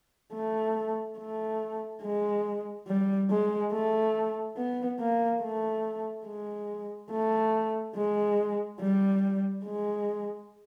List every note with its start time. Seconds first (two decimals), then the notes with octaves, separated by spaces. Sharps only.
0.33 A3
1.18 A3
2.03 G#3
2.87 G3
3.30 G#3
3.72 A3
4.57 B3
4.99 A#3
5.42 A3
6.26 G#3
7.11 A3
7.96 G#3
8.81 G3
9.65 G#3